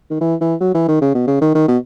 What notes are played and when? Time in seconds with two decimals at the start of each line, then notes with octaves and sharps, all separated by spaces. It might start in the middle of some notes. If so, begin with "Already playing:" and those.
0.10 D#3
0.21 E3
0.41 E3
0.60 F#3
0.74 E3
0.88 D#3
1.01 C#3
1.15 B2
1.27 C#3
1.41 D#3
1.54 D#3
1.68 B2